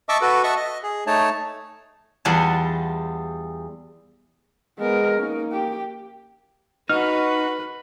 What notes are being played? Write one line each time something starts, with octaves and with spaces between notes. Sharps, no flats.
D#5 E5 A5 C#6 D6 E6
F#4 A4 B4
D#5 E5 F#5 A5 C#6
D#5
G#4
A3 D#4 C#5 A5
E2 G3 F4 F#5 G#5 A5
G#3 B3 A#4
A#3 C#4 D#4
G4
D#4 F#4 B4 B5 F6